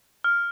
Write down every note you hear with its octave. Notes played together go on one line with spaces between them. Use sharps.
F6